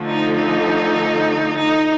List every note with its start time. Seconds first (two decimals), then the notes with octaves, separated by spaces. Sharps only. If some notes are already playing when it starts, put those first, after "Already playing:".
Already playing: D3 F3 A3
0.08 D#4
0.39 D#4
1.61 D#4